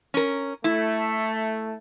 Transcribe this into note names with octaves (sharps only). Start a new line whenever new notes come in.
C#4 A#4
A3 E4